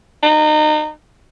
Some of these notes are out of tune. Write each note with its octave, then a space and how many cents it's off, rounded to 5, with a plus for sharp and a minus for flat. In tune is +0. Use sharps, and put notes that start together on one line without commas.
D#4 -30